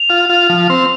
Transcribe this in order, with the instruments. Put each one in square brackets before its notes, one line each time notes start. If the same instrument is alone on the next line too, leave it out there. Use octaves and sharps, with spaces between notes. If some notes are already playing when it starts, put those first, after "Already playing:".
Already playing: [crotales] F7
[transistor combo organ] F4
F4
F3
C4